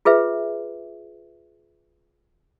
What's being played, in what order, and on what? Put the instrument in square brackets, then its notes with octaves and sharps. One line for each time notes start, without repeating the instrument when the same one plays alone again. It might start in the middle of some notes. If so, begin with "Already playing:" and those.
[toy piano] F4 G#4 B4 E5